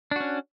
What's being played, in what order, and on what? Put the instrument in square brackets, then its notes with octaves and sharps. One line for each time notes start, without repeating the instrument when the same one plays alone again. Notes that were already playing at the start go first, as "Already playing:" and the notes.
[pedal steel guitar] D4
F#4
C#4